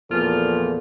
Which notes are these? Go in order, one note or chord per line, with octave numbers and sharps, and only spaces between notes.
E2 A#2 F3 F4 A4